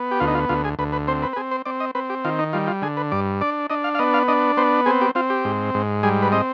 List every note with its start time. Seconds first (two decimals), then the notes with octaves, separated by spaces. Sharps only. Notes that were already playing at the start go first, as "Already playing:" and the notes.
Already playing: B3
0.11 G4
0.20 D2 F4
0.28 D#4
0.35 F4
0.49 D2 F4
0.64 G#4
0.79 D2 B4
0.92 B4
1.08 C4 C5
1.22 B4
1.33 B4
1.36 C4 G#4
1.51 C5
1.65 C4 D5
1.80 D#5
1.95 C4 B4
2.10 G4
2.25 D#3 F4
2.39 D#4
2.53 G3 F4
2.67 F4
2.82 D3 G#4
2.97 B4
3.12 G2 D5
3.41 D4 D5
3.70 D4 D#5
3.84 F5
3.95 F5
3.99 B3 D#5
4.14 F5
4.28 D4 D#5
4.57 B3 C5
4.86 C4 G#4
5.01 G4
5.15 C4 F4
5.30 G4
5.45 G#2
5.74 G#2
6.03 G3 G#4
6.22 B4
6.32 C4 D#5